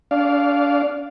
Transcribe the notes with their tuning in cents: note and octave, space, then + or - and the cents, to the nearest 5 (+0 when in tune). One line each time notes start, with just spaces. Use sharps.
D4 -35 D5 -15 F5 +0